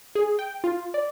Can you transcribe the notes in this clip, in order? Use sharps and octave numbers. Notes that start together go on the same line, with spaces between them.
G#4
G5
F4
D5